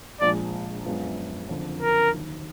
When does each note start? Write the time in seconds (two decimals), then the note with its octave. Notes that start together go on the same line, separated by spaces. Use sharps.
0.21 A#1 A#2 F3 G#3 D5
0.85 F#2 F3 G#3 B3 F4
1.49 F#1 F2 D3
1.82 A#4
2.13 D#2 D#3 F#3